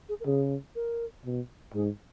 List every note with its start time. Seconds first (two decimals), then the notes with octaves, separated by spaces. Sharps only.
0.09 G#4
0.20 A#4
0.26 C#3 G#4
0.76 A#4
1.25 B2
1.74 G#2 G#4